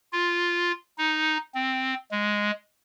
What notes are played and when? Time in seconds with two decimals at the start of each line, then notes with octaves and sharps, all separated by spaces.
0.13 F4
0.98 D#4
1.55 C4
2.11 G#3